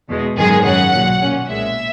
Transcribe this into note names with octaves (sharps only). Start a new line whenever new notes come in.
E2 B2 G#3
G#1 F#2 D#3 G#3 G#4
F#2 C#3 F#3 C#4 F#5
B1 A#2 F#3
A#2 A#3 C#4
B1 A#2 G#3 E5